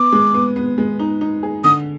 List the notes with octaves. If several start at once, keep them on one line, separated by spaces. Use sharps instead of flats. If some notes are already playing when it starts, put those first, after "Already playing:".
Already playing: B3 D6
G#3
B3
B3
G#3
D#4
D#4
G#4
D3 D#6